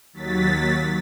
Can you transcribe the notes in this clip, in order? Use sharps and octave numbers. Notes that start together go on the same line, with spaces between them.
D#2 F#3 A6 B6